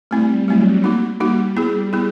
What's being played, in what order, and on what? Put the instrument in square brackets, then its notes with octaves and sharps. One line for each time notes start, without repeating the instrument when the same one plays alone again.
[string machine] G3 [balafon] A3 C4 E4
[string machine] F#3 [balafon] A3 C4 E4
[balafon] A#3 D#4 F#4
[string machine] G3 [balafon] A#3 D#4 F#4
[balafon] B3 E4 G#4
B3 E4 G#4